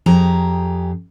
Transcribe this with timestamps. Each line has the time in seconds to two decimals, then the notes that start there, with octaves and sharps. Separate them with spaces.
0.06 F2 G4 G#4 A#5